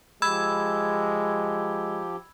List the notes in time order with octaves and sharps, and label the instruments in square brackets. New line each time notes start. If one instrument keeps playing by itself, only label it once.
[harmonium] F3 G4 [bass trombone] G#3 [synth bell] B5 E6 G#6